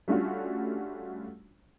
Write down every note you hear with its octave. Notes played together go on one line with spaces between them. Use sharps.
G3 A3 C#4 D4 F4 F#4